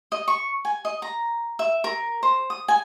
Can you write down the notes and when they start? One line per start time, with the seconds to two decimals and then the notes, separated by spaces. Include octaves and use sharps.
0.12 D#5
0.28 C#6
0.65 G#5
0.85 D#5
1.02 A#5
1.59 E5
1.84 A#4
2.23 C5
2.50 D#6
2.68 G#5